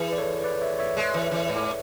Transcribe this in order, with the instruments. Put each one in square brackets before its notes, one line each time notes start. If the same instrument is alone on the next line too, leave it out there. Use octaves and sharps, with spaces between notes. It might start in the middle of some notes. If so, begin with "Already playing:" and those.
Already playing: [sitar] E3 [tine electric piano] G#4 B4
[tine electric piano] D5
A4 C#5
B4 D5
C#5 E5
C#5 E5
[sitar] G#3
E3
E3
G#2